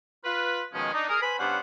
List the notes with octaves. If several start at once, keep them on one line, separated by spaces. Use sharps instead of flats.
F4 B4
B2 D#3 F3 G#3 C#4
D4 D#4
G#4 A#4
B4 C5 G#5 B5
G2 B3 C#4 D4 C5 F#5